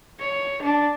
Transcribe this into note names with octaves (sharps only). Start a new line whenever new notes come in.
C#5
D4